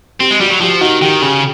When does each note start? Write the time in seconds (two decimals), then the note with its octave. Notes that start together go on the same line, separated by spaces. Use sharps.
0.20 C4 G4
0.31 G#3
0.41 G3 F#4
0.50 F#3
0.61 F3 G4
0.81 D#3 F#4
1.02 D#3 G4
1.22 C#3